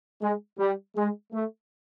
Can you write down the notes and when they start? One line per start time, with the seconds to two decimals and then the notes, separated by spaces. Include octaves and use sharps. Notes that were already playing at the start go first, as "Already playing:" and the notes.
0.21 G#3
0.59 G3
0.96 G#3
1.33 A3